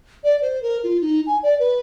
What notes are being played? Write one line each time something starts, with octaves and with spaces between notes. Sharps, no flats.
D5
C5
A#4
F4
D#4
G#5
D5
B4